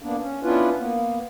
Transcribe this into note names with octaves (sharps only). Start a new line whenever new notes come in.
A#3 B3 D4
C#4
B3 C#4 D4 E4 F4 B4
A#3 B3